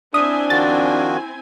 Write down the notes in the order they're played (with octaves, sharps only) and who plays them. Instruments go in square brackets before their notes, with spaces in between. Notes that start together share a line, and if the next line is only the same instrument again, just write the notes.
[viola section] C4 E4 G#5 [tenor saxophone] D4 [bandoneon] E5 [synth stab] D#6
[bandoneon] D#3 F3 F#4 [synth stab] A6